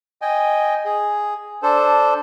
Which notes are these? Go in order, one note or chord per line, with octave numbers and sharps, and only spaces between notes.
D#5 G5 G#5
G#4
D4 A4 C5